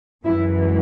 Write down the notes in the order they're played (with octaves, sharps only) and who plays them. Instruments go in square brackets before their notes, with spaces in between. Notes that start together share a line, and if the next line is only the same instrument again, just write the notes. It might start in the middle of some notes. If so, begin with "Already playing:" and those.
[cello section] F#2 E3 G#3 E4